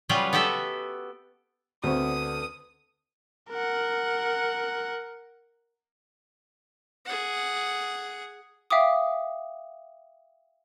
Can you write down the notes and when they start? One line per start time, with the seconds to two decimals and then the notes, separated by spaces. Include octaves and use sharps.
0.09 C#3 F#3 G3 F4 B4
0.33 B3 F#4 G4 A4 E5
1.84 D2 D3 B3 C4 C5 C#6 D#6
3.50 A#4 F#5
7.05 G#4 F#5
8.70 E5 F5 G5 D6 D#6